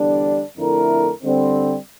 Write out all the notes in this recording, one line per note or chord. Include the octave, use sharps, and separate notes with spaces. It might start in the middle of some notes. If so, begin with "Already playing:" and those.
Already playing: E2 D3 G3 D4
F2 D3 A3 E4 A#4
D3 G3 C4